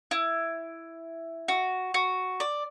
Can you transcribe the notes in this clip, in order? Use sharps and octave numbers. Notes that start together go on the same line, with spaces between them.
E4
F#4
F#4
D5